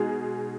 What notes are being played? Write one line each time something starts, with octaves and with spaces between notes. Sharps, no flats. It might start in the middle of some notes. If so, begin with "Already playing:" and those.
Already playing: B2 G#3 D#4 G#4